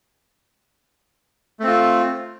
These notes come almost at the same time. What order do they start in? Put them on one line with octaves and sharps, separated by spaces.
A3 C4 F4